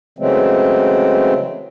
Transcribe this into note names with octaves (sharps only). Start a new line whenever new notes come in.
C#3 E3 F#3 G#3 A3 C4